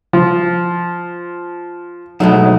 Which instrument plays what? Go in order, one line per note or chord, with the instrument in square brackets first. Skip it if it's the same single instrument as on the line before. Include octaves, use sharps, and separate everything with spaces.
[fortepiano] F3
[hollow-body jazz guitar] B2 G#3 A3 [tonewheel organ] F#3 D#4